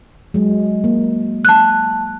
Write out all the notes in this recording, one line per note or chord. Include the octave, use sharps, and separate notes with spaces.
F#3 G#3
A#3
A5 F#6